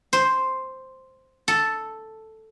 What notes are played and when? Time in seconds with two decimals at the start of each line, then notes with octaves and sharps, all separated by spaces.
0.13 C5
1.48 A4